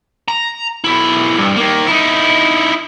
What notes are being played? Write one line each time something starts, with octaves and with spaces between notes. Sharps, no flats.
A#5
B1 E4
G2
D#3 A#3
D#4 E4